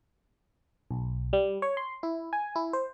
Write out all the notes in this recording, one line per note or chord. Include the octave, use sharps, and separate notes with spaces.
B1
G3
C#5
C6
E4
G#5
E4
C5